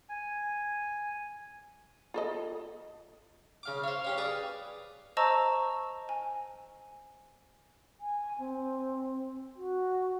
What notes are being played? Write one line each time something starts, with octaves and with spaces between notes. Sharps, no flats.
G#5
F4 A4 D#5
C#3 F5 D6
C5 C#5 F5
C#4 G4 C#5
G#4 B4 D5
C5 D#5 A5 A#5 C#6 E6
G#5
G#5
C4
F#4